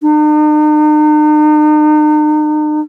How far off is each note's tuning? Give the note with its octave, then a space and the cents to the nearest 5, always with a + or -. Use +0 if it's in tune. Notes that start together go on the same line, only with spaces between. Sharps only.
D#4 -45